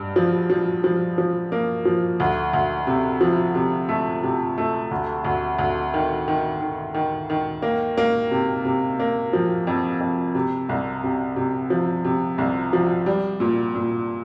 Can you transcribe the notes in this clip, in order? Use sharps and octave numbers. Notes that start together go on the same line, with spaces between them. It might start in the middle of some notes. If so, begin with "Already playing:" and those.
Already playing: G2
F3
F3
F3
F3
A#3
F3
D2
D2
C3
F3
C3
A3
C3
A3
D2
D2
D2
D#3
D#3
D#3
D#3
D#3
A#3
A#3
C3
C3
A#3
F3
F2
F2
C3
C2
C3
C3
F3
C3
C2
F3
G3
A#2
A#2